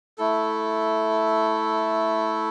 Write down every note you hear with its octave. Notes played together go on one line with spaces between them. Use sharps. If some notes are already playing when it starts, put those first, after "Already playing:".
A3 E4 A4